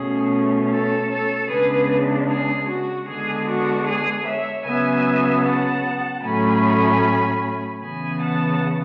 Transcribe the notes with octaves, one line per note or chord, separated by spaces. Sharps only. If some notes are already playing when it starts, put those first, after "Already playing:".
Already playing: B2 A3 C#4 G#4
A4 C#5
A4 C#5
C#3 G#3 B3 D4 G#4 B4
G#4
F#4
D3 G#3 B3 D4 G#4
F#4
G#4
C#5 E5
C#3 F#3 B3 E5 G#5
F#5 A5
A2 F#3 A3 C#4 G#5 B5
C#3 E3 B3 G#5 B5
F#5 A5